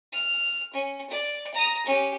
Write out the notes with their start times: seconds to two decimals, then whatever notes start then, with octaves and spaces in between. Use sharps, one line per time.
0.12 F6
0.73 C#4
1.10 D5
1.54 A#5 D#6
1.86 C#4 G4